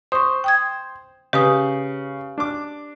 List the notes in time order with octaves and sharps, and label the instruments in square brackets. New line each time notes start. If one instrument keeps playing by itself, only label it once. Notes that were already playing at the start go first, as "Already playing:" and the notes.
[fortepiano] C5 [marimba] C#6 D#6
[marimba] G5 D#6 G#6
[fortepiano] C#3 [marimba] G4 B4 D#6
[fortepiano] D4 D6